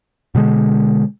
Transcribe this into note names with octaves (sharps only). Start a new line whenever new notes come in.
B2 D3 G#3